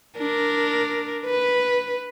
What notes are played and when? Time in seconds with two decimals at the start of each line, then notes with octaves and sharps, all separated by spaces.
0.18 D4 A#4
1.26 B4